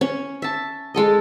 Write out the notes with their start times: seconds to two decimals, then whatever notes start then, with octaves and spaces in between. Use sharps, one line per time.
0.01 C#4
0.42 E5 A5
0.94 G#3 A4 D#5